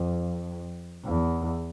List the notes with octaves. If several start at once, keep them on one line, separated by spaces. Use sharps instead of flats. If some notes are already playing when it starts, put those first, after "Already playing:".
Already playing: F2
E2